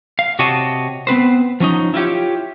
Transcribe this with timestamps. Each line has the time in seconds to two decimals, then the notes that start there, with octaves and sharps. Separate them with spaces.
0.19 F5
0.39 C3 F#4 G4 C#5 D#5 A5
1.07 B3 C4 B4 C5
1.60 F3 F#3 C#4 D#4
1.94 E4 F4 G4 C#5